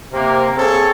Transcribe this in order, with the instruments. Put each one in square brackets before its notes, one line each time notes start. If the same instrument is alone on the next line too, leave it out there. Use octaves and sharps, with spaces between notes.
[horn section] C3 A#3
C4 G#4 A4 C#5